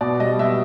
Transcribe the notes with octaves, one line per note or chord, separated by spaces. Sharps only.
B2 D5
G3 D#5
B2 E5